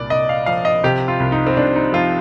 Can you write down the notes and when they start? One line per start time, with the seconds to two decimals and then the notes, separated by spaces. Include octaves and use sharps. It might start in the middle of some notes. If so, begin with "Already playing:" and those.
Already playing: C2 A#2 D5
0.10 C2 D#5
0.29 F5
0.46 F3 F5
0.65 D#5
0.84 C3 G4
1.08 F4
1.20 C2
1.32 D#4
1.47 C4
1.56 C2 D4
1.76 D#4
1.93 F3 F4